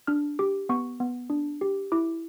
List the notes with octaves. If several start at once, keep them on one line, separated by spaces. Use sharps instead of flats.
D4 F6
G4 D6
B3 C#6
B3
D4
G4
E4 D6